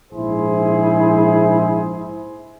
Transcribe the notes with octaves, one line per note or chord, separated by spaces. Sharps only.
A#1 G#2 E4 G#4 C5